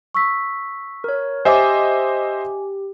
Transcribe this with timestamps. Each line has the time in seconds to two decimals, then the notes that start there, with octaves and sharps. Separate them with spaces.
0.15 C#6 E6 B6
1.04 A#4 C#5
1.45 G4 C5 D#5 E5 G#5 D6